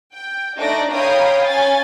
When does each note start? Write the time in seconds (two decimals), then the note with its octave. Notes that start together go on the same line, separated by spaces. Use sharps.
0.14 G5
0.57 A3 D4 D#4 D5 A#6 D7
0.93 C#5 F5 G5 A#5 B5 D#6
1.46 C#4 G#5 A6